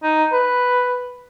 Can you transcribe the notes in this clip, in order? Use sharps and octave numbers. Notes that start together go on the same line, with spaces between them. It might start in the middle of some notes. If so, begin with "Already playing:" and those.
D#4
B4